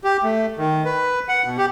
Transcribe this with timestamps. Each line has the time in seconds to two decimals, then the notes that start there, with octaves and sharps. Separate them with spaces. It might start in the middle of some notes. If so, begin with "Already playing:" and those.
0.04 G4
0.23 A3
0.58 D#3
0.85 B4
1.29 F#5
1.45 B2
1.58 G4